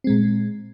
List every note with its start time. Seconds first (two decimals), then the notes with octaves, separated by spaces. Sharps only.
0.04 C4
0.07 G#3
0.10 A#2